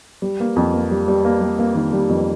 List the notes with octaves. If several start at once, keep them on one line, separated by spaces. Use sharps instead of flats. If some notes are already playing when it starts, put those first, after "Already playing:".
G3
A#3
F2
A#3
G3
G3
A#3
G3
A#3
D#3
G3
F2